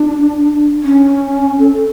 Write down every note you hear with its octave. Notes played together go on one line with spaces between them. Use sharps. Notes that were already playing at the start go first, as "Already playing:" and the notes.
Already playing: D4
C#4
A4